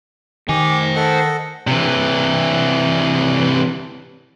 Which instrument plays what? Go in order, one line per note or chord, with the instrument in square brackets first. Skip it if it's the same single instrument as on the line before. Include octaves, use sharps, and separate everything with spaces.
[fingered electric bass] D#3 [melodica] G4 D#5 [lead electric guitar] C5 G#5
[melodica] A4 D#5 F#5
[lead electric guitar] C3 E3